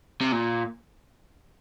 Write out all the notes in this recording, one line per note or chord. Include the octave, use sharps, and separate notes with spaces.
C3
A#2